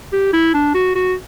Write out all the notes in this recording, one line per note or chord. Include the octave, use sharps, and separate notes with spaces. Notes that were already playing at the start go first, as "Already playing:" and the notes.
G4
E4
D4
F#4
F#4